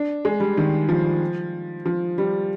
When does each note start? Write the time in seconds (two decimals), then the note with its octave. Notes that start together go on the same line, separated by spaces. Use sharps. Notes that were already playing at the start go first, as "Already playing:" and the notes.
Already playing: D4
0.25 G#3
0.40 G3
0.57 D#3
0.89 F3
1.86 F3
2.18 G3